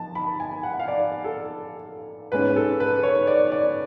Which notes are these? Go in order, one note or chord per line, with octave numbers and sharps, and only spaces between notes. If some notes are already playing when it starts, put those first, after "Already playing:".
Already playing: F3 A5
B5
G#5
F#5
F5
D5
A4
G#2 G#3 C#4 B4
A4
B4
C#5
D5
D5